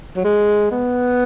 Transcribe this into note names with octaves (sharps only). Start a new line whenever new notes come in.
F#3
G#3
B3